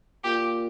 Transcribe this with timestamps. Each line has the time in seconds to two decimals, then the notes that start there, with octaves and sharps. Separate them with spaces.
0.24 A#2 G4